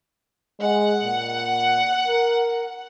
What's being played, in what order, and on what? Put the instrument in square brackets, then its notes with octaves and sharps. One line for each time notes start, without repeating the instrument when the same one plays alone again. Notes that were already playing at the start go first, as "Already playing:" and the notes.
[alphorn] G#3 [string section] F#5
[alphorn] A#2
A#4